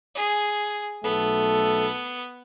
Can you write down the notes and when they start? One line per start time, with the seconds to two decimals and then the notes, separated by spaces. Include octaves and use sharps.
0.15 G#4
1.04 B1 A3 B3 A4